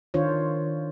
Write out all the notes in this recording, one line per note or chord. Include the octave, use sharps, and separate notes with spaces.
D#3 D4 F4 C5 C#5